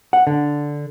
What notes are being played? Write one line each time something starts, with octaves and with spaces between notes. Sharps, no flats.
F#5
D3